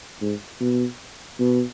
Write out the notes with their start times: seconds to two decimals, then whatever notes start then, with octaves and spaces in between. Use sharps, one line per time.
0.22 G#2
0.60 B2
1.39 B2